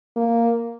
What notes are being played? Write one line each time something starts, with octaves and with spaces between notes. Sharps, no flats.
A#3